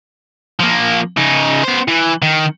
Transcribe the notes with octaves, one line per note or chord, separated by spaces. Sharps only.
F3 A#3
C#3 D#4
B3 C5
E3
D#3